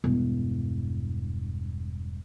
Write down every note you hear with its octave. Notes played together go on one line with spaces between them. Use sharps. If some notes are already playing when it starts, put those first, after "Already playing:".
E1 G2